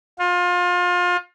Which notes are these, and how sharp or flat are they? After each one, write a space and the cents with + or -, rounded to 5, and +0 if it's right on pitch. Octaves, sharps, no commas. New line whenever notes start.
F4 +30